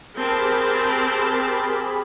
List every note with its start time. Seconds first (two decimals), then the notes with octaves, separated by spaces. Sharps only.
0.16 C4 G4 G#4 A#4 A5 B5